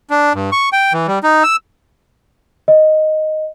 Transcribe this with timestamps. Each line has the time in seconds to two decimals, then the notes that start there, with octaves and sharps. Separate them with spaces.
0.10 D4
0.34 G2
0.52 C#6
0.73 G5
0.93 E3
1.07 G3
1.23 D#4
1.43 E6
2.68 D#5